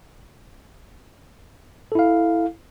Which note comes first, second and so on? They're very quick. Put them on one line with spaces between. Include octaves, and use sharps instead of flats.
A4 E4 F5